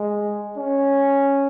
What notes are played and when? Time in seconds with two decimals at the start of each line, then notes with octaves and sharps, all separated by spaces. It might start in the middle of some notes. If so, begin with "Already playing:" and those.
Already playing: G#3
0.58 C#4